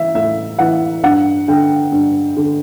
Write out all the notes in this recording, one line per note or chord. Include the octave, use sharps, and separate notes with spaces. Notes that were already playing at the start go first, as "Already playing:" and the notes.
Already playing: E3 E5
A2 E5
E3 F#5
G2 F#5
D3 G5
G2
D3